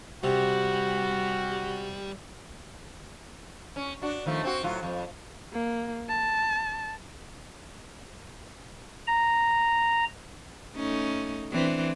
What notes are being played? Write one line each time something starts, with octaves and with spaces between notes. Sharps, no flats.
C3 G3 F#4
C#4
D4 F#4
D#3 F3 A3
C4 F#4
A2 F#3 F4
F2
A#3
A5
A#5
A3 C#4 D#4
E3 C4 D4